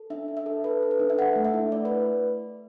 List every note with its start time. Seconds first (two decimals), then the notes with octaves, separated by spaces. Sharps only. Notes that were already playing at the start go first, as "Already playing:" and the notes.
Already playing: A4
0.10 D4 E5
0.28 D4
0.37 E5
0.46 A4
0.64 A4 B4
0.83 A4
0.91 B4
0.99 D4
1.10 E5
1.18 A4 F#5
1.36 A3
1.45 E5
1.54 E4
1.72 A3 D5
1.85 B4